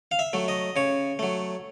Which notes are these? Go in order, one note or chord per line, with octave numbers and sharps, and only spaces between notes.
F5
E5
F#3 A3
D#5
C#3 C#5
F#3 A3